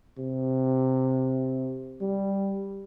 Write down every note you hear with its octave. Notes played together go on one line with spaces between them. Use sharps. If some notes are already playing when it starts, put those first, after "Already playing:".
C3
G3